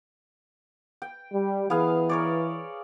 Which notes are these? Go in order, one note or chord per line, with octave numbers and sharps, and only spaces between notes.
G5
G3
E3 B3 G#4 F5
A#4 C#5 D5